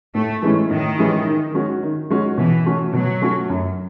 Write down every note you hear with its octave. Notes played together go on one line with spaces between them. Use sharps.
A2 A3
E3 G#3 C#4 E4
A2 D#3
E3 G#3 C#4 E4
D#3
G#3 C#4 F#4
D#3
G#3 C#4 F#4
B2 E3
A3 C#4 F#4
B2 F#3
A3 C#4 F#4
F#2